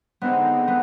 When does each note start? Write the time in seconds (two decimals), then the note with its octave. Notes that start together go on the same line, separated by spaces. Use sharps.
0.21 D3 G#3 B3 C4 D#4
0.68 B3